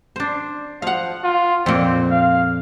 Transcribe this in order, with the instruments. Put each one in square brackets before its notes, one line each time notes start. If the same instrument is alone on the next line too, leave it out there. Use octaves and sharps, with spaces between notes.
[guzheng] D4 C5
[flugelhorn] F3 [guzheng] F5 F#5
[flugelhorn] F4
[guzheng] F2 A#2 [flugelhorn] C4
[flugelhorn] F5